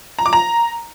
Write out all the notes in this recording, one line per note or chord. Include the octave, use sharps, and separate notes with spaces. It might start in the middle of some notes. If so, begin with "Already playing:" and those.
A#5
D6
A#5